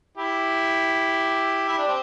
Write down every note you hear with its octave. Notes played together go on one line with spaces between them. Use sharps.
E4 G4
E4
D4
C4